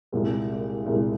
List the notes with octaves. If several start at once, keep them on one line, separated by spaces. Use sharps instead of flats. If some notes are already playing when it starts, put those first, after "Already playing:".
C2 A#2 G#3
C2 A#2 G#3